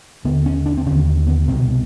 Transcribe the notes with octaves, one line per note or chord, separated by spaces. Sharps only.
D#2 D3 B3
C#4
D4
C4
D#2 D3 C#4
B3
C2 B2 C4